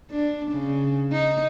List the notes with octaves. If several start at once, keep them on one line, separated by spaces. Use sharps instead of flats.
D4
C#3
D#4